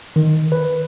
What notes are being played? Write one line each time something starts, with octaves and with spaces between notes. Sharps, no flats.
D#3
B4